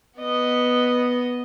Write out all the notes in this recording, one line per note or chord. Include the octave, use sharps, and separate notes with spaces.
B3 D#5